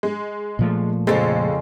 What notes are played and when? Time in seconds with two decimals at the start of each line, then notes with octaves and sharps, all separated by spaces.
0.03 G#3
0.59 A#2 F3 A3
1.07 F2 A2 C#3 G#3 A4 A6